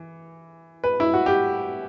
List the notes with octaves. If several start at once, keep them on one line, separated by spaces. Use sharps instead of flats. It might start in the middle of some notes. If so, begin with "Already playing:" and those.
Already playing: E3
B4
E4
F#4
G4